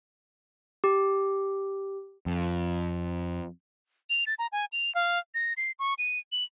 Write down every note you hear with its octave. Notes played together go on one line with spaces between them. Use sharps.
G4
F2
F7
A6
A#5
G#5
F7
F5
A#6
C7
C#6
D#7
F#7